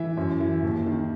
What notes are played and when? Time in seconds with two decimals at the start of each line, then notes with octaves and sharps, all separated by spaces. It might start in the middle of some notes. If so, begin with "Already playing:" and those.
Already playing: E3 E5
0.17 F#2
0.40 E3
0.63 D#2
0.86 D#3